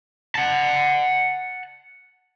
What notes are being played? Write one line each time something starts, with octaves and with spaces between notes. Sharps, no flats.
F#5 A5